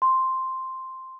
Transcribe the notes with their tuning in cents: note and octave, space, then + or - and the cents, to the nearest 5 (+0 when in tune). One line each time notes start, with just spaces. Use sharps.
C6 +0